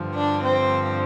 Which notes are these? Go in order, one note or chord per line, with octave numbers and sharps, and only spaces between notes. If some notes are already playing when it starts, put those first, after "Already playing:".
Already playing: G2 D3 F3
D4
C4